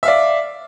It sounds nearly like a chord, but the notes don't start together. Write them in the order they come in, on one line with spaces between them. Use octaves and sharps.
E5 F5 D5